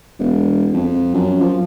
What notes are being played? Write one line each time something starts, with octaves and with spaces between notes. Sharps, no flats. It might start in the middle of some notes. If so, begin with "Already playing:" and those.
E1
F2
F#2
F3